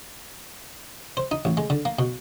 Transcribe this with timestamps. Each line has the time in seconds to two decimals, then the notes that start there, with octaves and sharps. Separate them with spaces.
1.17 C5
1.31 D#4
1.45 A1
1.57 G#3
1.70 D3
1.85 A#3
1.99 B2